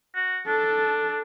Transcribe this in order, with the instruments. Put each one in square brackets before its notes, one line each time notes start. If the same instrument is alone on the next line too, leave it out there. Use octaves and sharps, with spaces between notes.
[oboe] F#4
[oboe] D4 [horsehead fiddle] A4